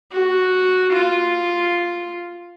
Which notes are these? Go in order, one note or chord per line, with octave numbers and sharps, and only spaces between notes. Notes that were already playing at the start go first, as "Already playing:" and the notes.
F#4
F4